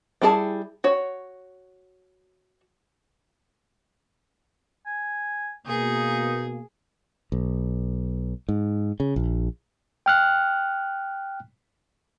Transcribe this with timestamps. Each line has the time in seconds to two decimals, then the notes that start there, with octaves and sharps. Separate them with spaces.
0.22 G3 D4 E4 G#4 A5
0.84 F#4 C#5
4.86 G#5
5.67 B2 A#3 D#4 G#4
7.32 B1
8.49 G#2
9.00 C#3
9.16 A#1
10.06 G5 F6 F#6